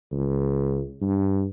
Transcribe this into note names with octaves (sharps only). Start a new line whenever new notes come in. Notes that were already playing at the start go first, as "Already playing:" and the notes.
C#2
G2